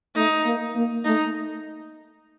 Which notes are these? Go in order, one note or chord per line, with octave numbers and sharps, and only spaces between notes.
A3 D#4
A#3
A#3
A3 D#4